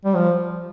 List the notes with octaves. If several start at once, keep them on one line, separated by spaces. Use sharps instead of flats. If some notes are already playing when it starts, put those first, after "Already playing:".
G3
F3